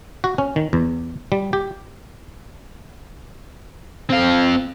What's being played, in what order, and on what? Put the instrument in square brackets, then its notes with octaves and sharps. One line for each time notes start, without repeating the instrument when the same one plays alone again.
[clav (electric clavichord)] F#4
C#4
D#3
E2
G3
G4
[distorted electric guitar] C4 F5